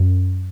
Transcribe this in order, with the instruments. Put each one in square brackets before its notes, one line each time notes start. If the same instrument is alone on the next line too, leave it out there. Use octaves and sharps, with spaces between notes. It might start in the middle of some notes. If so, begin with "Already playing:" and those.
Already playing: [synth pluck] F#2